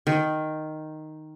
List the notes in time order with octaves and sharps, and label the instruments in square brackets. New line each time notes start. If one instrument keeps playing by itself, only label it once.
[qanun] D#3